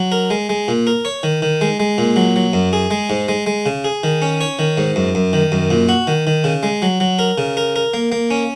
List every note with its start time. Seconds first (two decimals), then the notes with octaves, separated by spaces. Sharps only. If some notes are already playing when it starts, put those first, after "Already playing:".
Already playing: F#3
0.12 A#4
0.30 G#3
0.49 G#3
0.68 A#2
0.87 A#4
1.05 C#5
1.23 D#3
1.42 D#3
1.61 G#3
1.80 G#3
1.98 A#2
2.16 F#3
2.36 F#3
2.53 F#2
2.73 G#4
2.91 G#3
3.10 G#2
3.28 G#3
3.46 G#3
3.66 C#3
3.84 G#4
4.03 D#3
4.22 C#4
4.41 C#5
4.59 D#3
4.77 G#2
4.96 F#2
5.15 F#2
5.33 D#3
5.52 F#2
5.70 A#2
5.89 F#4
6.07 D#3
6.27 D#3
6.44 C#3
6.63 G#3
6.82 F#3
7.00 F#3
7.19 A#4
7.38 C#3
7.57 A#4
7.76 A#4
7.94 A#3
8.12 A#3
8.30 C#4